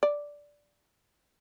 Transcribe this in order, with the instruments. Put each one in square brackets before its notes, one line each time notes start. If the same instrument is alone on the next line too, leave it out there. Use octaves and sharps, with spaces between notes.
[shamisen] D5